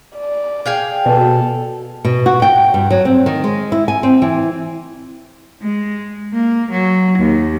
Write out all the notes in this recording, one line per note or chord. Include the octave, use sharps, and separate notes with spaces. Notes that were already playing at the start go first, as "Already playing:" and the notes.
D5
G#4 F5 G5
B2 A4
B2
F#4
G5
G2
F#3
C4
D#3
G#3
E4
G#5
C4
E3
G#3
A#3
F#3
D#2